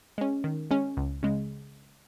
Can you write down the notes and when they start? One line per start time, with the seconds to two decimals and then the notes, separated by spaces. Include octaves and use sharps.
0.18 G#3 C#4
0.44 D#3
0.71 G#3 C#4
0.97 C#2
1.23 C#3 G#3